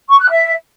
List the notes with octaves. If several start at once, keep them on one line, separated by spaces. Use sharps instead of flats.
C#6
F#6
E5